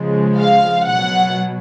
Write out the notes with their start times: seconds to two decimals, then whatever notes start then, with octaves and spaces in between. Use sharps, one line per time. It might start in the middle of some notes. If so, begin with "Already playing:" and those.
Already playing: C#3 F3 G#3
0.38 F5
0.88 B2 F#3 F#5